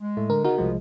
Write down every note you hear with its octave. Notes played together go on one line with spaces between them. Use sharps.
G#3
A2 A3
D3 A#4
C#3 B3 D#4 F#4 A#4
C2 F3 G#3